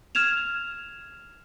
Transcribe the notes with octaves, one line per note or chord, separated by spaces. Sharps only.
F6 G#6 E7 F7